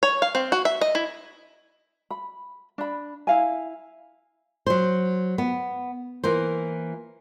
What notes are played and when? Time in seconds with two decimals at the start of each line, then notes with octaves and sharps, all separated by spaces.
0.03 C#5
0.22 F5
0.35 C4
0.52 F#4
0.65 E5
0.81 D#5
0.95 E4
2.10 B5
2.78 D4 B5
3.27 E4 F5 G#5
4.66 F#3 C5
5.38 B3
6.24 E3 A#3 C5